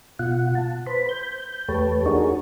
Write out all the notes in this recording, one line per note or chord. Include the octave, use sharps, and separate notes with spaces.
B2 F4 F#5
A5
B4 C5 B5
G6
E2 A3 G4 B4 C#5 A5
D4 D#4 F#4 G#4 A#4 C#5